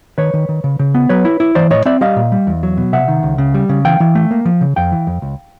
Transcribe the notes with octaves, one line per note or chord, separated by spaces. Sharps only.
D#3 B4 C#5
D#3
D#3
C#3
C#3
B3
F#3 B4 C#5
E4
E4
E3 C5 D5
A2 C#5 D#5
C4 D5 E5
G3 D#5 F5
A#2
G3
E2
F#3
B2
C3 E5 F#5
D#3
C#2
C#3
G3
C#3
E3 F5 G5
E3
A3
A#3
F3
C#3
F2 F5 G5
E3
F2
C#2